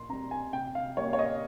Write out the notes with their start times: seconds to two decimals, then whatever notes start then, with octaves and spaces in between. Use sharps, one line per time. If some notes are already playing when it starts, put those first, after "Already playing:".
Already playing: A#2 C6
0.09 C4 A#5
0.13 G3
0.31 G#5
0.53 C3 G5
0.75 F5
0.97 G3 A#3 C#4 C#5
1.13 C#5
1.19 D#5